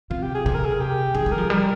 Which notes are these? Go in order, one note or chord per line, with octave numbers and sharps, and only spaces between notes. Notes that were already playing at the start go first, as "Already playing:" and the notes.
C3 F4
G4
G#4
C3 G#4
A#4
G#4
G4
D#3 G#4
G3
A#4
F3
G3 A#4